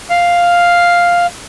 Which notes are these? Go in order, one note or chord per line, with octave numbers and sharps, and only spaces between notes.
F5